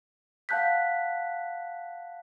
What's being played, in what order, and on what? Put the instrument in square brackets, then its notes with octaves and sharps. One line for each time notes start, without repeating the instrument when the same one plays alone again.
[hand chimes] F5 F#5 A5 F#6 G6 B6